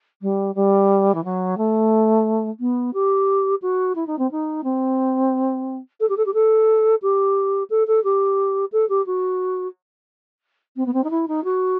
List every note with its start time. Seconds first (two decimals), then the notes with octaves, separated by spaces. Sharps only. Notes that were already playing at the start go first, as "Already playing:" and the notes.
0.22 G3
0.55 G3
1.15 E3
1.24 F#3
1.58 A3
2.60 B3
2.94 G4
3.62 F#4
3.96 E4
4.07 D#4
4.19 C4
4.31 D#4
4.64 C4
6.00 A4
6.09 G4
6.17 A4
6.26 G4
6.34 A4
7.02 G4
7.70 A4
7.87 A4
8.04 G4
8.72 A4
8.89 G4
9.07 F#4
10.77 C4
10.86 B3
10.94 C4
11.04 D#4
11.11 E4
11.28 D#4
11.44 F#4